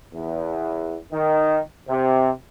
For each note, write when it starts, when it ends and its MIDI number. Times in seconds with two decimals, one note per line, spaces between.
0.12 0.96 40
1.11 1.59 51
1.88 2.29 48